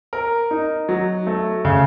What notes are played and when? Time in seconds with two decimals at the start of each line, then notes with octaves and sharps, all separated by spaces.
0.13 A#4
0.51 D#4
0.89 F#3
1.27 A3
1.65 C#3